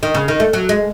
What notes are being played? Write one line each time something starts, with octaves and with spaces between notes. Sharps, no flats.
D#3
C#3
D#3
A3
F#3
G#3